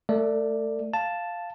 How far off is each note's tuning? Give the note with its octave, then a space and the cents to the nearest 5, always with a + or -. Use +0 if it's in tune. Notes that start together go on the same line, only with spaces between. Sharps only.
A3 +0 A4 +45 D5 +5
F5 +0 A5 +0